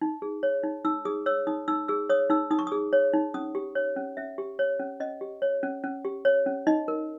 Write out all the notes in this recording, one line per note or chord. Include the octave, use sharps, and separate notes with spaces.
D#4
G#4
C#5
D#4
D#4 E6
G#4 D#6
C#5 E6
D#4 D#6
D#4 E6
G#4 E6
C#5 D#6
D#4 E6
D#4 D#6
C#6
G#4 D#6
C#5
D#4
C#4 D#6
G4
C#5
C#4
C#4 E5
G4
C#5
C#4
C#4 D#5
G4
C#5
C#4
C#4
G4
C#5
C#4
D#4 D#5
A#4